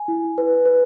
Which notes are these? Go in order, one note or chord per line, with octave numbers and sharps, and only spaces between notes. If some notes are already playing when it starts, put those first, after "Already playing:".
Already playing: G#5
E4
B4
B4